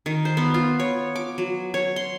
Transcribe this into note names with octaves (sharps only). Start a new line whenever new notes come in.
D#3
C5
B3
F4
C#5
D6
F#3
C#5
C6